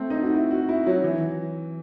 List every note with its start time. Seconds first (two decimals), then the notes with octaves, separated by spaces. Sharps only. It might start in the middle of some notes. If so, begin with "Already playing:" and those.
Already playing: A3 C4
0.10 D#4
0.22 F#4
0.34 E4
0.51 F#4
0.69 E4
0.87 F#3
1.04 E3